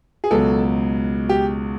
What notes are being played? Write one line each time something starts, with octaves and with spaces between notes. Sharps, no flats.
G#4
C#2 B2 F#3 A4
G4